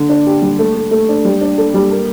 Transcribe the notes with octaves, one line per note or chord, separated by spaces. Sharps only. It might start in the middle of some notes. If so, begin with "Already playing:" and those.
Already playing: D3
D4
G4
G3
A3
A3
A3
D4
G3
D4
A4
G3
A#3